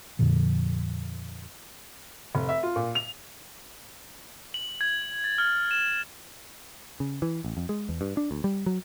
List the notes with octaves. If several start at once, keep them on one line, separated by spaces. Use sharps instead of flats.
F2 A#2 D3 F3
F1
E5
F4
A#2
F7
F#7
G#6
A6
F6
E7
C#3
E3
A1
F2
G#3
E2
G2
D4
D2
G3
F#3